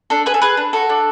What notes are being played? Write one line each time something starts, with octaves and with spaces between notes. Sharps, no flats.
D4 A4
G#4 B4
A4
G#4 B4
D4
F#4 A4
D4